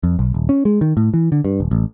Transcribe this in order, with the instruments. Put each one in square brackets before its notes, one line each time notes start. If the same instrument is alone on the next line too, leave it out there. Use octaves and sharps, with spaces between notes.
[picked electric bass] F2
B1
D#1
C#4
G#3
D#3
A2
E3
D3
G2
D#1
A1